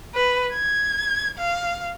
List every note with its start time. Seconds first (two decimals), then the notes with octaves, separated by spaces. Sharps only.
0.15 B4
0.53 G#6
1.38 F5